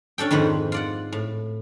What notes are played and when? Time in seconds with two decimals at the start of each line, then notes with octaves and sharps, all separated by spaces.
0.18 C#4 D4 A4 G5
0.31 F2 G#2 D#3 B4 C5 F#5
0.72 F4 D5 F#5
1.12 A2